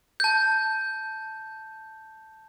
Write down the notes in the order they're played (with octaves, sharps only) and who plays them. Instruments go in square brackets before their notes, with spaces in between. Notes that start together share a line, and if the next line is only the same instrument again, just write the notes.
[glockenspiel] A5 G6